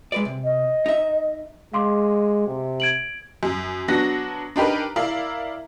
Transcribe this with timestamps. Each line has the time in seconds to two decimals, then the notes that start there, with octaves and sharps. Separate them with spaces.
0.12 G#3 B4 D5
0.25 C3
0.44 D#5
0.86 D#4 E5
1.73 G#3 F5 C6 D6
2.47 C3
2.80 G#6 D7 F#7
3.43 F#2
3.88 F#3 B3 D4 F#4 A#6
4.56 D4 D#4 G4 A#4 B4
4.96 E4 A#4 D5 E5 F5